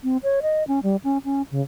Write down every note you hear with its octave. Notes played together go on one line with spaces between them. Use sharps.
C4
C#5
D#5
C#4
G3
C#4
C#4
C#3